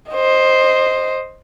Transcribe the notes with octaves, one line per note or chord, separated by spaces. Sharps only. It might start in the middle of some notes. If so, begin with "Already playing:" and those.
C5 D#5